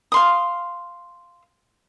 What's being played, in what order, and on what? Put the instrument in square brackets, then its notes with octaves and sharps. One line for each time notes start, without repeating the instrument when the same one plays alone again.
[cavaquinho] F5 C6 D#6